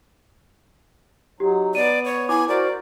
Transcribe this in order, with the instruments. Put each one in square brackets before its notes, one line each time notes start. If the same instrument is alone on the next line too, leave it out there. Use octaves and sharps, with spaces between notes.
[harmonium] F#3 D#4 [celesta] G4
[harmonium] B3 [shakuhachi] D5 [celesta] D#7
[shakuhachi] C#5
[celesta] E4 D6 [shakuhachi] G#5
[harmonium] F#4 A#4 C5 [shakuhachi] D5